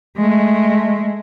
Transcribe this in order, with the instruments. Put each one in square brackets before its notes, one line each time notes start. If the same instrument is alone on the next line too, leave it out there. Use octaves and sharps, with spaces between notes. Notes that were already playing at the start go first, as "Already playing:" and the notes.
[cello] G#3 A3